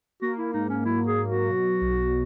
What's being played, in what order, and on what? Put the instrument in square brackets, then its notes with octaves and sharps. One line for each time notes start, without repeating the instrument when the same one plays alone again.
[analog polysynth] A#3 [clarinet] F#4
[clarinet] E4
[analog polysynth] G#2 [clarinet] D#4
[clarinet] C#4
[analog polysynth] F#3 [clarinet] E4
[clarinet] G#4
[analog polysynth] F#3
[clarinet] F#4
[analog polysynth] B2
B1